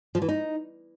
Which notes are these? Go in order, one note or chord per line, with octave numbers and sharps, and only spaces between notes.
F3
E3
D#4